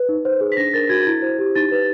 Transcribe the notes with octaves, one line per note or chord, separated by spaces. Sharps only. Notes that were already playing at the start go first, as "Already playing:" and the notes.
Already playing: B4
D#4
C5
G#4
B6
D4 A#6
A#4 A6
F#4 G#6
E4
C5
G4
D#4 A6
B4